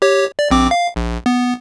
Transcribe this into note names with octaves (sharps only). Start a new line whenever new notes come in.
G4 C#5
D5
A#1 C4 D6
F5
A#1
B3